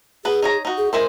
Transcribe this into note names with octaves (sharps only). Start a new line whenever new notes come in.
B3 G#4 B4
D#4 C#5 A#5
D#4 F#4
G#4
G#3 E4 A#4 C5